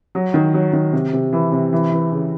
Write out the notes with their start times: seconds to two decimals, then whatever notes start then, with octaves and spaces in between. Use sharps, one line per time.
0.15 F#3
0.34 D#3
0.54 F#3
0.73 D#3
0.93 C3
1.13 C3
1.33 E3
1.52 C3
1.73 E3
1.92 E3
2.12 C#3